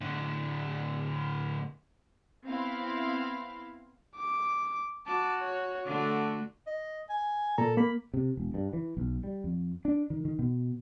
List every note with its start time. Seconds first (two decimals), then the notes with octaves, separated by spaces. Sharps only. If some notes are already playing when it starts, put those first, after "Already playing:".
0.01 A2 D3
2.47 B3 C4 E4 F5
4.16 D6
5.06 F#4 A5 D6
5.41 C#5
5.85 D3 A3 F#4 D6
6.67 D#5
7.10 G#5
7.58 A#2 A4 A#5
7.77 A#3 B5
8.14 C3
8.37 E1
8.54 G2
8.73 E3
8.97 B1
9.24 G3
9.44 F2
9.85 D4
10.10 D#3
10.25 D#3
10.39 B2